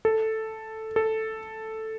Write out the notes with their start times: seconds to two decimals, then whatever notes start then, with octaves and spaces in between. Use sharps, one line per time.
0.05 A4
0.96 A4